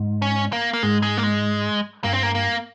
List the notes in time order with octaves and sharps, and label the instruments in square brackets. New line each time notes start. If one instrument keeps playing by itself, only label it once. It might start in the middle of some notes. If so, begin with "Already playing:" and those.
Already playing: [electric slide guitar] G#2
[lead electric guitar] C#4
A#3
A#3
[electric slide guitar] G#2 [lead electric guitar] G#3
[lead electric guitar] G#3
A#3
G#3
[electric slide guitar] G2 [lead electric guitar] A#3
[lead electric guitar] C4
A#3
A#3